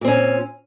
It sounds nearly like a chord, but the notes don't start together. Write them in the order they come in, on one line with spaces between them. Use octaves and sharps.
A#2 C4 C#4